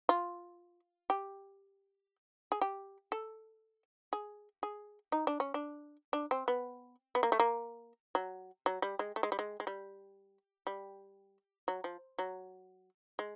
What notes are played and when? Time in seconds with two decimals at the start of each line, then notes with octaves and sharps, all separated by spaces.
0.09 F4
1.10 G4
2.52 G#4
2.61 G4
3.12 A4
4.13 G#4
4.63 G#4
5.12 D#4
5.27 D4
5.40 C#4
5.54 D4
6.13 D4
6.31 C4
6.48 B3
7.15 B3
7.23 A#3
7.32 A3
7.39 A#3
8.15 F#3
8.66 F#3
8.82 G3
8.99 G#3
9.16 A3
9.23 G#3
9.32 G3
9.39 G#3
9.60 G#3
9.67 G3
10.67 G3
11.68 F#3
11.84 F3
12.19 F#3
13.19 G#3